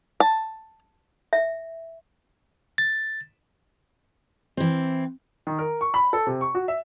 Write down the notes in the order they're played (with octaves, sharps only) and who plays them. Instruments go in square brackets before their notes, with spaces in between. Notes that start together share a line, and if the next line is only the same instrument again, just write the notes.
[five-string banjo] A5
[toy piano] E5
[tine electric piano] A6
[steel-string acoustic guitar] E3 C4
[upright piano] D#3
A#4
C#6
B5
A4
C3
C#6
F#4
E5